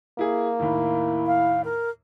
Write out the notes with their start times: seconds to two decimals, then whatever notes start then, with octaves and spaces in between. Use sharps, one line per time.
0.19 A#3 E4 G#4
0.60 D#2 A2 E4
1.27 F5
1.64 A#4